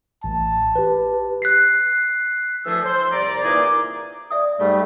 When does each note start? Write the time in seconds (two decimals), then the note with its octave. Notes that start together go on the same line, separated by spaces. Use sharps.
0.24 A1 A5
0.76 G4 B4
1.42 F#6 B6 C7
2.65 D2 E3 F3 A3 G#4 E6
2.83 C5
3.11 C2 D5 A#5
3.43 A#2 E3 D#4 G#4 D6
4.31 D5 E5 D#6
4.60 G#2 G3 A3 D5